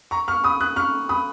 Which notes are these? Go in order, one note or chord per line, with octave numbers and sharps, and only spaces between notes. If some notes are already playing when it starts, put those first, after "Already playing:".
A#5 C#6
C#6 F6
B5 D#6
D#6 F#6
C#6 F6
B5 D#6